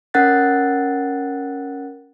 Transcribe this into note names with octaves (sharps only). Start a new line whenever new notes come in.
C#4 A#4 F#5 F#6 A6